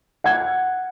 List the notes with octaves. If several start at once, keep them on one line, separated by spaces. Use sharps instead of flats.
F#5 G#6